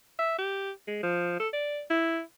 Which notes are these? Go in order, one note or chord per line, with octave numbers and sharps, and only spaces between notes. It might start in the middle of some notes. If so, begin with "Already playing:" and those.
E5
G4
G#3
F3
A4
D5
E4